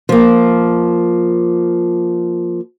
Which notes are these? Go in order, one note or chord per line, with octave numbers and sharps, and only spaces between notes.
F3 A#3